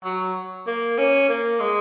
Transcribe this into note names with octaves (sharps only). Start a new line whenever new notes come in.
F#3
A#3
C#4
A#3
G#3